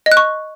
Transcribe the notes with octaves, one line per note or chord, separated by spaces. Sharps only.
D#5
F#6
C#6